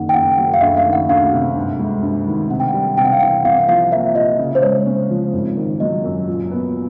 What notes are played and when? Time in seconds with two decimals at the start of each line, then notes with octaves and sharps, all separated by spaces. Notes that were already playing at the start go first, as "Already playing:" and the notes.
Already playing: F#1 D#3 F#5
0.09 G5
0.14 F#1 F#5
0.38 F#2
0.54 F5
0.61 D2 E5
0.77 F5
0.85 D#3
0.93 F#5
1.09 D2 F5
1.32 C3
1.56 G2
1.79 G#3
2.02 G2
2.27 D#3
2.50 C3 F#5
2.60 G5
2.69 G3 F#5
2.97 C3 G5
3.05 F#5
3.13 F5
3.20 E3 F#5
3.44 C2 F5
3.68 F3 F5
3.91 A#3 E5
4.15 A#2 D#5
4.39 C#3
4.55 C5
4.62 G#3 C#5
4.86 C#4
5.10 F3
5.33 G#1
5.57 D#3
5.80 F#3 D#5
6.04 F#2
6.28 A#2
6.51 B3